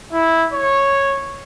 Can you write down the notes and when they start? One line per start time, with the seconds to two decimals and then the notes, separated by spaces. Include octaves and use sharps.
0.12 E4
0.53 C#5